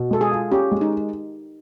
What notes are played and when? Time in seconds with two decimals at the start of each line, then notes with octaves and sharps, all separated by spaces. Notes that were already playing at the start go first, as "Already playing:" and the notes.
Already playing: B2
0.11 G#3 A4
0.21 G#4
0.31 F4
0.52 C#4 G4
0.72 G#3
0.81 D#4